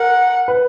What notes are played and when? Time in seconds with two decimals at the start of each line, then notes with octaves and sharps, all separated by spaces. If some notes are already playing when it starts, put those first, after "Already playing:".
Already playing: A#4 F#5
0.48 B4